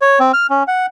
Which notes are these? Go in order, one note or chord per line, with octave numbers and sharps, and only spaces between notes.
C#5
C4
F6
C#4
F#5